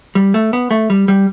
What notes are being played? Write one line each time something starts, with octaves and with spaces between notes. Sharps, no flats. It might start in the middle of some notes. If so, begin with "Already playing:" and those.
G3
A3
B3
A3
G3
G3